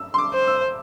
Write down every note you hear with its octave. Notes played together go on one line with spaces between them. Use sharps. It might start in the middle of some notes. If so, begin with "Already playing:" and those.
Already playing: E6
C6
D6
C5
E6